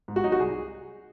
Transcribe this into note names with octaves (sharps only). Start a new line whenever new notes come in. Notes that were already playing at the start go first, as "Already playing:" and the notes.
G#2
F#4
F#3 D#4
F#4
C2 G#4